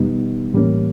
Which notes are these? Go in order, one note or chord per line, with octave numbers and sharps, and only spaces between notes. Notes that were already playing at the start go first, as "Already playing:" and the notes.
Already playing: E2 B2 G3 B3 D#4
A2 E3 G3 A#3 C#4